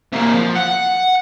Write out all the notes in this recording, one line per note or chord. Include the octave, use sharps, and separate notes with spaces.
C3 A#3
F3
F#5